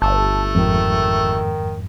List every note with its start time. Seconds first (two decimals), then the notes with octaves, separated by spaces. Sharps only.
0.02 G1 A3 A5
0.55 F2 G#2 D#3